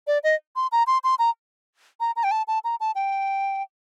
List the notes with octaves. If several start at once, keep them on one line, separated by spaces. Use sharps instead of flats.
D5
D#5
C6
A#5
C6
C6
A#5
A#5
A#5
G5
A5
A5
A#5
A5
G5